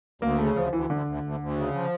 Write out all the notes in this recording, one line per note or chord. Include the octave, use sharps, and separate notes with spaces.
D2 A#3
C#3 A3
D2 F3
D2 E3
D2 D3
D2
D2
D2
C#3
F3